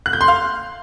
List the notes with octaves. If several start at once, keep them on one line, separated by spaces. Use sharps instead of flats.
F#6
G6
C6
F5